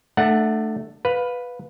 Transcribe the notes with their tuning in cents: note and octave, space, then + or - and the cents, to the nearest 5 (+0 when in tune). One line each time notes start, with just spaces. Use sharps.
A3 +0 D4 +35 F#5 +0
B4 +0 F5 +25